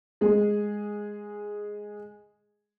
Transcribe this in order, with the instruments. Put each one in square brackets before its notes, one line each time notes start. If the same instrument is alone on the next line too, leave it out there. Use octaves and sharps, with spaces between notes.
[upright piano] G#3 G#4